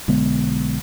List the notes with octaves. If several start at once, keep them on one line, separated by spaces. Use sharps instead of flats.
B1 D3 G#3 B3